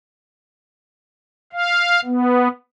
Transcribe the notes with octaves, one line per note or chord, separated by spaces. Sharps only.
F5
B3